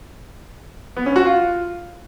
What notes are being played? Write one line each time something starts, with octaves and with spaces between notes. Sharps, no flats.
B3
C#4
F#4
F4